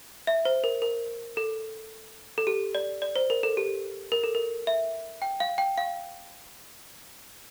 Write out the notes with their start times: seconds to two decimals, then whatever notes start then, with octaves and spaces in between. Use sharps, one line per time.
0.27 E5
0.45 C5
0.64 A#4
0.82 A#4
1.37 A4
2.38 A4
2.47 G4
2.75 D5
3.02 D5
3.16 C5
3.30 A#4
3.43 A4
3.57 G4
4.12 A#4
4.24 A4
4.35 A#4
4.67 E5
5.22 G5
5.40 F5
5.58 G5
5.78 F5